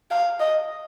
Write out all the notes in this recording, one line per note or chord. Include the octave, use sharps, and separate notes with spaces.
F5
D#5